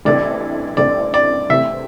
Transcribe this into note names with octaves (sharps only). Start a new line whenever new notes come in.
A1 G2 E3 C4 A4 D5
A1 G2 E3 C4 A4 D5
D5
C3 E3 A3 C4 G4 E5